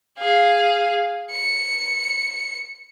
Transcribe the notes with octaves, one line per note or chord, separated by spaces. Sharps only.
G#4 F5
C#7